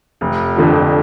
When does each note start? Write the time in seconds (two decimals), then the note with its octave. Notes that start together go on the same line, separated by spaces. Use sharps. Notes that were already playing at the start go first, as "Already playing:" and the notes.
0.21 F1
0.56 F2 D3 F3